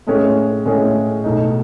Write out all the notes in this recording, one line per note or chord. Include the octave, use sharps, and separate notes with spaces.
A2 G#3 C#4 G#4 C#5
A2 G#3 C#4 G#4 C#5
B1 B2 A3 D#4